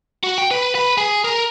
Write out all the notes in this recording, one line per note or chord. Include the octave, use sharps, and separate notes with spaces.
F#4
G5
B4
B4
G#4
A#4